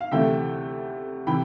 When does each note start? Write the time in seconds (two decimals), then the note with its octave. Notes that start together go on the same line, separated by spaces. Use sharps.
0.01 F5
0.11 D2 C3 E3 A3 E5 G5
1.27 C3 E3 G5 B5